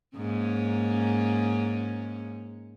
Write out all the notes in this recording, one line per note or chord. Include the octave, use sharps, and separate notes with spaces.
G#2 A#3 C#4